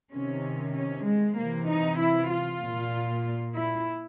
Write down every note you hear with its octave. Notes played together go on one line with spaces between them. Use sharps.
C3 D#3 C#4
C#4
G#3
C3 E3 A#3
D#4
E4
F4
A#2
E4